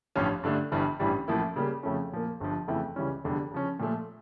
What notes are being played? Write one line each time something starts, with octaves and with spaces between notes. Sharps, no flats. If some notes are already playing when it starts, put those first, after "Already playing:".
A1 G2 F3 C#4
G2 D3 A3 D4
G1 G2 E3 G3
A1 G2 E3 G3
A1 A2 F3 A#3 E4
C#3 G3 A#3
F2 C#3 F3 A3 C#4
A#2 F3 A#3
G1 G2 F3
F2 C#3 E3 A3 E4
C#2 C#3 E3 G3 C#4
F1 E2 D3 G3
C#3 F3 C#4
A#2 F3 A3